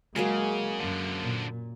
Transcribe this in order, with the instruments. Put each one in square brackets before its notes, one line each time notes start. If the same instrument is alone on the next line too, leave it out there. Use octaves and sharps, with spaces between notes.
[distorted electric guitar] C#3 [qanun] F#3 A#3 G#4 [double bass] G#3
[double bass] F#2 [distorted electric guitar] D3 F3
[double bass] A#2